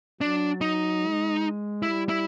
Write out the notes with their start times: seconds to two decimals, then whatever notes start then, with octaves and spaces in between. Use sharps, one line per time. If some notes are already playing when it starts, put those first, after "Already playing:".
0.20 F#3 D4
0.61 D#4
1.01 G#3
1.82 G3 E4
2.09 E4